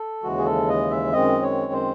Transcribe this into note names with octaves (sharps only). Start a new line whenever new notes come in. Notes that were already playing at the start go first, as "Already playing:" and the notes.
Already playing: A4
D#2 C#3 E3 G#3 F#4
G#4
A4
D#5
E5
F#2 D#3 G#3 C4 D#5
C#5
C5